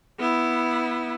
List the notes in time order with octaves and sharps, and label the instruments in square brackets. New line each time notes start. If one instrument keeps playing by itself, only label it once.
[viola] B3 E4